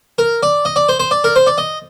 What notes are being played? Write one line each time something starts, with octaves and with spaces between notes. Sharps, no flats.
A#4
D5
D#5
D5
C5
C5
D5
A#4
C5
D5
D#5